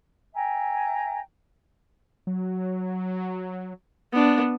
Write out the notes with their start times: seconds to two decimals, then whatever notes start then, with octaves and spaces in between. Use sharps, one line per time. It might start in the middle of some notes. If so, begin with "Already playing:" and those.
0.33 E5 G5 G#5 A#5
2.27 F#3
4.12 B3 D4